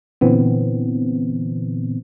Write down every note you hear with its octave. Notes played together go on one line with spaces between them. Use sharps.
A#2 D3 E3 B3 C4